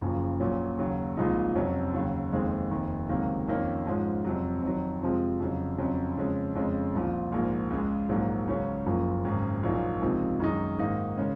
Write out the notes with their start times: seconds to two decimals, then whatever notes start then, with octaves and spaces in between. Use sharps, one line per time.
0.01 F#1 F#2 C#3 F3
0.40 A#1 A#2 F#3 C#4
0.78 D#2 C#3 F#3
1.17 C2 A#2 F3 G#3 D#4
1.55 F2 C3 F#3 C#4
1.94 D#2 C#3 F#3
2.32 F1 D#2 D#3 G#3 C4
2.71 F1 D#2 D#3
3.09 C#2 C3 D#3 F#3 A#3
3.48 F2 D#3 A#3 C#4
3.86 G#2 F3 G#3 C#4
4.25 F2 C3 F#3
4.62 F2 D#3 F#3
5.01 F2 C3 F3 G#3
5.40 F2 C#3 F#3
5.78 F2 C#3 F#3 C#4
6.17 F2 C#3 G#3 C#4
6.55 F2 C#3 G#3 C#4
6.94 C2 A#2 F3
7.32 A#1 G#2 F3 A#3
7.70 C#2 C#3 G#3
8.09 A#1 G#2 F#3 A#3
8.47 C#2 C#3 F#3 C#4
8.86 F#1 F#2 F3 A#3
9.25 G#1 F#2 C#3
9.63 A#1 A#2 F#3 A#3 D#4
10.01 C#2 C3 F3 A#3 D#4
10.40 F#2 D#3 G#3 D#4
10.78 G#2 D#3 A#3 D#4
11.17 C#3 G#3 C#4